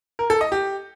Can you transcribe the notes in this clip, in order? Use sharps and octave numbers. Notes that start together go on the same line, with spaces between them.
A#4
A4
D#5
G4